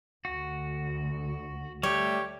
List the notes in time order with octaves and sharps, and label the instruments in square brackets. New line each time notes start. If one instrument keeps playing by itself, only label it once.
[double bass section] D2 [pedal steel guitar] F#4
[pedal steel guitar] G3 A3 [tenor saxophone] G4 [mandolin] C#5